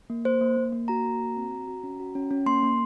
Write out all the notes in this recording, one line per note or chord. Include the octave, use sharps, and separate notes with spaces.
A#3
A#3 C5
A#3
A#3
A#3
F#4 A#5
A#3
F#4
C4
F#4
F#4
C#4
F#4
C#4
C#4
A#3 C6
A#3